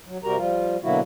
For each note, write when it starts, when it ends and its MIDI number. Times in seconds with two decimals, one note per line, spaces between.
0.07 0.18 54
0.24 0.36 48
0.24 0.36 55
0.24 0.36 66
0.24 0.36 67
0.24 0.36 70
0.24 0.36 82
0.37 0.77 53
0.37 0.77 55
0.37 0.77 65
0.83 1.00 47
0.83 1.00 50
0.83 1.00 54
0.83 1.00 58
0.83 1.00 64
0.83 1.00 66